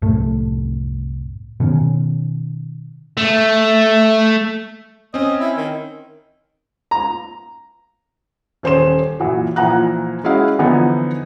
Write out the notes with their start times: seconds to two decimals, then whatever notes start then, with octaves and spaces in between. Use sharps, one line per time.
0.02 C2 F#2 A2 A3
1.60 B2 D#3 C#4
3.17 A3
5.14 C4 C#4 D#5
5.40 E4
5.56 D#3
6.91 A#5
8.63 D#1 C#4 C5 C#5 C6 E7
9.19 A#2 E3 F#3
9.56 A#2 E3 F3 A#5 F#6
10.24 G#3 C#4 E4 F#4 D#5 F5
10.59 D3 E3 F3 B3 D4 D#4